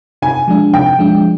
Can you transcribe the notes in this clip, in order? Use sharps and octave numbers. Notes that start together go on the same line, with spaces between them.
C3 G#5
F3 G#3 D4
C3 G5
F3 G#3 D4